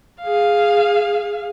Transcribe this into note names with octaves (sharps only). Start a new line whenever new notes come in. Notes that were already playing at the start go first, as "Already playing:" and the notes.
G#4 F5